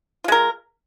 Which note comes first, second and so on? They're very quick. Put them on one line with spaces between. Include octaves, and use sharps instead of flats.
F4 G#3 A#4